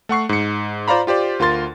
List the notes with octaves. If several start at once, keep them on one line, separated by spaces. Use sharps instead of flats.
A3 F#5 C#6 C7
G#2 C#7
F4 C5 D5 F5 A#5 B5
F4 G4 C5 D5
D2 F4 A#4 C6 A6